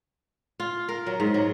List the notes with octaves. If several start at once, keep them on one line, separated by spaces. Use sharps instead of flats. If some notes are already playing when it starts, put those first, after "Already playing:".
F4
A#4
F#3
G#2
F#3